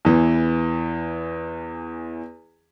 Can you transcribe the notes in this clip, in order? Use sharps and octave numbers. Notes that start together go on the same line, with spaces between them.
E2 E3